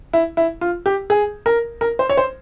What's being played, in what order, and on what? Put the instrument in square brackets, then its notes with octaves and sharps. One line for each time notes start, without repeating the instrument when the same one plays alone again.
[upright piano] E4
E4
F4
G4
G#4
A#4
A#4
C5
C#5
C5